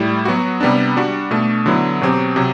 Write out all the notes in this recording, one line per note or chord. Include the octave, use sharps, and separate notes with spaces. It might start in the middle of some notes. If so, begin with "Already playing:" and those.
Already playing: A2 G3 E4
F#3 B3 F#4
C3 G3 B3 D4
G3 D4 F#4
B2 A3 D4
D3 F#3 B3 E4
B2 F#3 C4 G4
C3 F#3